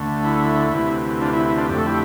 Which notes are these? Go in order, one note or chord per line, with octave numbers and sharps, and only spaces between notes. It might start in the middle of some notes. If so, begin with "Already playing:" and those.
Already playing: D2 D3 A3
E4
D2 C3 E3
D4 F4
E4
E4
D4 F4
F2 D3 A3 G4
A4
E4 G4